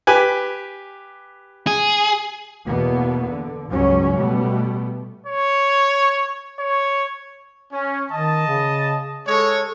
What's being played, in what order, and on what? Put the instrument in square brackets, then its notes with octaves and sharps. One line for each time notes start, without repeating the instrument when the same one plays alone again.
[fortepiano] G4 B4 G#5
[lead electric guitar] G#4
[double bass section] E2 B2 A#3 B3
D3
C#2 G2 F#3 C#4
B2 G3 A3 B3
[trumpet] C#5
C#5
[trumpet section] C#4
[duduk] D#3 [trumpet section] D#5 A5
[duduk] C#3
[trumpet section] G#3 C#5 [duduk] A4